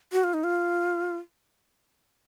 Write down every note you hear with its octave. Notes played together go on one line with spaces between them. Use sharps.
F#4
F4
D#4
F4